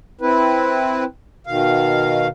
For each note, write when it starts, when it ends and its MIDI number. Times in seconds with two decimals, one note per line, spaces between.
0.21 1.04 60
0.21 1.04 64
0.21 1.04 71
1.47 2.28 47
1.47 2.28 51
1.47 2.28 77